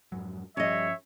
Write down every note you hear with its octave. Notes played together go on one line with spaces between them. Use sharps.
F2 G#2 F#3
G2 F3 G3 C#4 C#5 D#5 E5